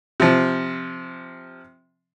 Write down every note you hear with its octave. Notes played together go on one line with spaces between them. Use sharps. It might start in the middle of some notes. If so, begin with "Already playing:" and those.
C3 F3